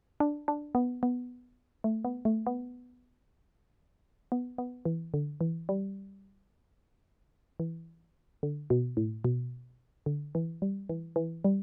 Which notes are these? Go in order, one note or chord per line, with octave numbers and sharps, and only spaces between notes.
D4
D4
B3
B3
A3
B3
A3
B3
B3
B3
E3
D3
E3
G3
E3
D3
B2
A2
B2
D3
E3
G3
E3
E3
G3